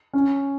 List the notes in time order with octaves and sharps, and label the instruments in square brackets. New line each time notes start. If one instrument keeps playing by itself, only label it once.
[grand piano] C#4